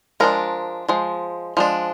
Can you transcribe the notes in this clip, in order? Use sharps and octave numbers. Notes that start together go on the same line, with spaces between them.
F3 G#3 D4 A#4
F3 G#3
F3 G#3 D4